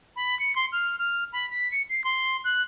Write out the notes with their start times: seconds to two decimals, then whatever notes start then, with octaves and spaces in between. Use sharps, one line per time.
0.16 B5
0.39 C#7
0.56 C6
0.72 F6
0.99 F6
1.33 B5
1.51 B6
1.72 C#7
1.90 C7
2.04 C6
2.44 F#6